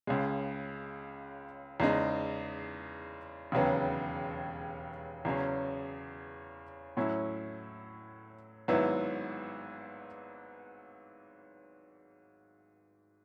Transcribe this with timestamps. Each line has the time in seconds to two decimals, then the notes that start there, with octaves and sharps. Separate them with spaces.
0.07 C#2 C#3 G#3
1.80 E2 C#3 G#3 D#4
3.52 E1 D#2 C#3 F#3 B3
5.25 E2 C#3 F#3 C#4
6.97 A2 F#3 C#4 E4
8.68 G#1 G#2 F#3 B3 E4